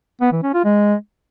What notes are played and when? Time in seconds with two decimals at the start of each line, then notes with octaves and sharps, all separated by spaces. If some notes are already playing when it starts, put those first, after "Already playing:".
0.21 B3
0.32 E3
0.43 C#4
0.54 F4
0.65 G#3